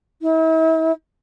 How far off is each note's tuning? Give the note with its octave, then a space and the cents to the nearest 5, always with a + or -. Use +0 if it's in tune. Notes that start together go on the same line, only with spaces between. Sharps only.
E4 -40